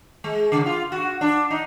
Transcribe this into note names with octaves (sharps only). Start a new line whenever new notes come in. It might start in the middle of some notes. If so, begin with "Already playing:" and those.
G#3
C#3
F4
F#4
D4
D#4